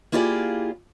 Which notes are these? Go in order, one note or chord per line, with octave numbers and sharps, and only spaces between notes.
A#3 E4 F4 G4 G#4 D5